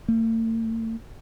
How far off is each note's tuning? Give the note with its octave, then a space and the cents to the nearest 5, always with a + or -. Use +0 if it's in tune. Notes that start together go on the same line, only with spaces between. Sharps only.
A3 +45